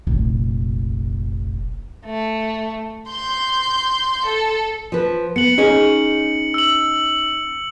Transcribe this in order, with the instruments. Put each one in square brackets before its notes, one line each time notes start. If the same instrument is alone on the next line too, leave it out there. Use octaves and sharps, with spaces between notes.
[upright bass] F1 A#1
[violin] A3
C6 G6
A4
[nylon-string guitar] F3 B4
[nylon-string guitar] B3 [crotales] C#7 F#7
[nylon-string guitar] C#4 D#4 G#4
[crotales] E6 F#7